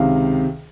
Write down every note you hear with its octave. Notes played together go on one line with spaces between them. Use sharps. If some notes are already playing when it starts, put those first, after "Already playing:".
Already playing: C#2 C3 D#3 F5